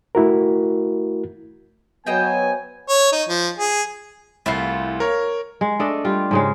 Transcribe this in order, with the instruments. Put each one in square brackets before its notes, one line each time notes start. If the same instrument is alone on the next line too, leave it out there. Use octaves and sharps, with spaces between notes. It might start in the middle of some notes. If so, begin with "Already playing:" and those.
[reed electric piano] A3 E4 F#4 A#4
[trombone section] F#3 B3 [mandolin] C5 D#5 G5 [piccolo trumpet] G#5
[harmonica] C#5
D#4
F3
G#4
[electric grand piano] C2 C7 [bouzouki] A3 E4 F4
[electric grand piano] A#4 C#5
[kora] G#3
A3 D4 A4 D#5
G3 F4
G#2 C#3 G#3